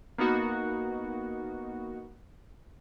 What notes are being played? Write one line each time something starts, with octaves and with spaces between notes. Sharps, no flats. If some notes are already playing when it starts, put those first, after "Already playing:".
A#3 B3 D#4 F#4